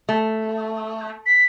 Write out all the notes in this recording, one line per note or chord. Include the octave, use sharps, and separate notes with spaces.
A3
B6